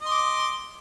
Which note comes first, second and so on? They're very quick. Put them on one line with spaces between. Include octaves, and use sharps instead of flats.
D#5 C6 D6